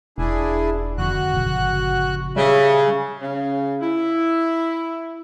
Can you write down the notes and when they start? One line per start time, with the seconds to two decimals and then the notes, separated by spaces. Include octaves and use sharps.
0.18 E1 D4 E4 G#4
0.98 F2 D3 D#3 F#4 F#6
1.37 G1 A#2 C#3 F3
2.36 C#3 G3 E5 G#5
3.21 C#3
3.81 E4